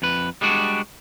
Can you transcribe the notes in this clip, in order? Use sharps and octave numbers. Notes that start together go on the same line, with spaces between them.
F2 B4
G3 G#3 D4 F#4